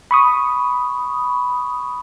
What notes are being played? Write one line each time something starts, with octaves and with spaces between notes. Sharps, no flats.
B5 C#6 D#6